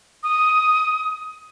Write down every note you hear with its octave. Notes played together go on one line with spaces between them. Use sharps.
D#6